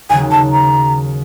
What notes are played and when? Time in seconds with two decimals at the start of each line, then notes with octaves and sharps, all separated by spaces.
0.09 D#2 C#3 F#3 G#5
0.31 A5
0.52 A#5